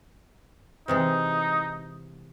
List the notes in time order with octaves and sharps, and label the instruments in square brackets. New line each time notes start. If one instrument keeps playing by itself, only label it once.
[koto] C3 E3 G#3 [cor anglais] D#4